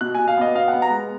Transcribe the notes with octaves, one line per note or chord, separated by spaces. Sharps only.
B2 F#6
B2 G#5
F5
B3 D#5
B2 F5
B3 F#5
A#5
G#3